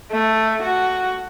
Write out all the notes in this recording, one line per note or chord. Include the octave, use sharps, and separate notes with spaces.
A3
F#4